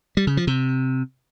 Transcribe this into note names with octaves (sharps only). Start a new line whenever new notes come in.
G3
C#3
F3
C3